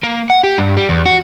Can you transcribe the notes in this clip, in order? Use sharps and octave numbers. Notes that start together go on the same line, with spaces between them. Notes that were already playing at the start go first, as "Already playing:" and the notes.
A#3
F#5
G4
G2
G3
E2
F#4